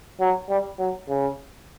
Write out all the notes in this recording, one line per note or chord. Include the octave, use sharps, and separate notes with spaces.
F#3
G3
F#3
C#3